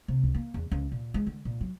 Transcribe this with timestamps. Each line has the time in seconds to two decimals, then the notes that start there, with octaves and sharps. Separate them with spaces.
0.08 C3
0.23 C#2
0.35 A#3
0.54 E2
0.72 C#2
0.92 A#2
1.14 G#3
1.27 D3
1.45 A#2
1.61 F#3